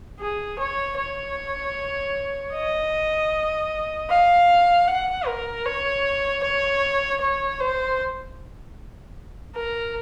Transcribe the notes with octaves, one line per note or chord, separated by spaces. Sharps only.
G#4
C#5
C#5
D#5
F5
F#5
A#4
C#5
C#5
C#5
C5
A#4